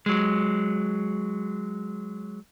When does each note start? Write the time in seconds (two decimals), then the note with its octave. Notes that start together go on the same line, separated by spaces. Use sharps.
0.06 F#3 G#3